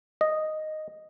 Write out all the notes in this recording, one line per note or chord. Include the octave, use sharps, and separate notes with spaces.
D#5